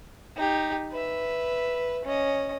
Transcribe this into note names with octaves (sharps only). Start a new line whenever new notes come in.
D#4 G4
B4 E5
C#4 D#5